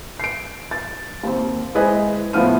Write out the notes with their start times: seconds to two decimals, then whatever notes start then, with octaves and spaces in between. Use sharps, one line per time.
0.20 C7 D7
0.71 A6
1.23 D#2 C4
1.75 G#3 E4 B4 C5 D#5 G#5
2.33 A2 F3 B3 C5 F6 D#7